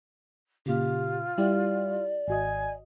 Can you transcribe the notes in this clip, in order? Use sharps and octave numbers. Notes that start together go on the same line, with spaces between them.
A#2 C#3 F4 G4
G3 E4 G4 D5
G#1 F#4 D#5 G#5